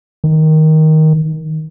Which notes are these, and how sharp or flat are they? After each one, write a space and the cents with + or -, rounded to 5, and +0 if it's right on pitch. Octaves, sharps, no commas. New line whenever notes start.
D#3 +10